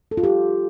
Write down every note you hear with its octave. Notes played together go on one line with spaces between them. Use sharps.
A4
F4
G4